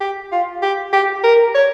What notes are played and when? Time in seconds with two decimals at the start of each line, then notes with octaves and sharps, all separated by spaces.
0.01 G4
0.32 F4
0.62 G4
0.93 G4
1.24 A#4
1.55 C#5